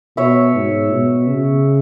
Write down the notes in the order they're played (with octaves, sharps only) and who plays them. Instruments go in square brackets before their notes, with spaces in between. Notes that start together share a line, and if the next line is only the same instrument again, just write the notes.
[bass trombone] B2 [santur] C#5 E5
[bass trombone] G#2
B2
C#3